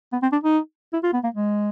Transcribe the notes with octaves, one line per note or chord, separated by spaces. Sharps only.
B3
C4
D4
D#4
E4
F4
B3
A#3
G#3